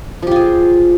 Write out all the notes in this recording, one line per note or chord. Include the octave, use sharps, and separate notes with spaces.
F3 F4 G4 G#4